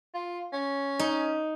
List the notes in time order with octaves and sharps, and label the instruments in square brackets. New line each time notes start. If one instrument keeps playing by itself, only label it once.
[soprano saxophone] F4
C#4
[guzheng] D#4